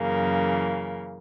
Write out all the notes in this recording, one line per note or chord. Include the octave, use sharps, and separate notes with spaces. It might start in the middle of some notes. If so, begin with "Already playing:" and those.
Already playing: F#2 C#3 E3 A#3